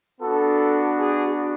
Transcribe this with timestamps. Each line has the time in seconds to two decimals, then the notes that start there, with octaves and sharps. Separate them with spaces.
0.21 B3 D4 F#4 A4
0.97 G#4